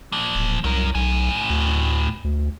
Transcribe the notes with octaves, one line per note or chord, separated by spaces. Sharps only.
F3 A#3
D1
C2 F#3 A#4
B1 A2 G#5
D2
D2